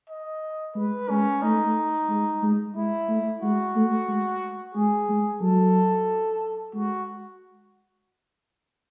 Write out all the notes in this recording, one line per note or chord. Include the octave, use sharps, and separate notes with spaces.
D#5
G#3 B4
G#3 C#4
A3 D#4
G#3
G#3
G#3 E4
A3
G#3 F#4
A3
G#3
G#3 G#4
G#3
F#3 A4
G#3 F#4